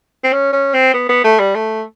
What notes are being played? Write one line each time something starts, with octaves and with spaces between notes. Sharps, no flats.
C4
C#4
C#4
C4
B3
B3
A3
G3
A3